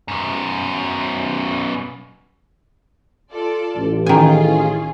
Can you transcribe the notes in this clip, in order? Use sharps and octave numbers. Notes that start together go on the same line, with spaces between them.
F#2 B2
F4 A4 D5
A1
D#3 C#4 F4 G#4 G#5